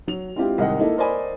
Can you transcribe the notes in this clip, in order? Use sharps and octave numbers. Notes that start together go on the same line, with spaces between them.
F#3 F7
G#3 C4 D4 E4 F4 G4
C2 G#2 D#3 D#5 F#5 G5
A#3 D#4 E4 A4
A#4 C5 D5 D#5 G#5 B5